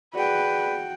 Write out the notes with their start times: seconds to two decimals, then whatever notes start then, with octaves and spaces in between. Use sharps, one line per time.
0.15 F#4 G#4 B4 D5 G5